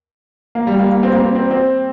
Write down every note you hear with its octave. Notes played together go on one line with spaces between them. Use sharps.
A#3
G3
A#3
A#3
C4
A#3
C4
C4
C4